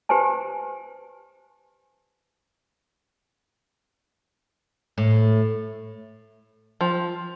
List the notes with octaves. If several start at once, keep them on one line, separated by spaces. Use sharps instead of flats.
G4 B4 C5 G#5 A5
A2
F3